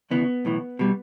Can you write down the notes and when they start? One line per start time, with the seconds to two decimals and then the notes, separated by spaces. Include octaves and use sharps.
0.11 D2 C#3 E3 B3
0.45 B1 A2 E3
0.79 B2 G3